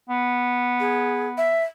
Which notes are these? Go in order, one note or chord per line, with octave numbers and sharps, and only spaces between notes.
B3
G#4
E5